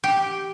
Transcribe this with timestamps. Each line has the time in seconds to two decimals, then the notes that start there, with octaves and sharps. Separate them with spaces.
0.04 G4